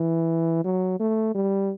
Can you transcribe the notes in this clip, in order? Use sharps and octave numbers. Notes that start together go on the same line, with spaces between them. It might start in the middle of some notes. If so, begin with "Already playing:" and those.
Already playing: E3
F#3
A3
G3